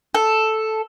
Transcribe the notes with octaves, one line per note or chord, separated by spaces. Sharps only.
A4